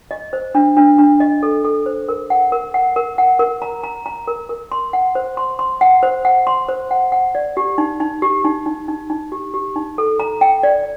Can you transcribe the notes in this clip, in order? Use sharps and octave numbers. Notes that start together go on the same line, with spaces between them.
D#5
C5
D4
D4
D4
D#5
A4
A4
C5
A#4
F#5
A#4
F#5
A#4
F#5
A#4
A#5
A#5
A#5
A#4
A#4
C6
F#5
C5
C6
C6
F#5
C5
F#5
C6
C5
F#5
F#5
D5
G4
D#4
D#4
G4
D#4
D#4
D#4
D#4
G4
G4
D#4
A4
A#5
G5
D5